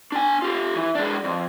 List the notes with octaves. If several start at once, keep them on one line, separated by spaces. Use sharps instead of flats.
D4 G#5
F4 G4
E3
G#3 D4
F2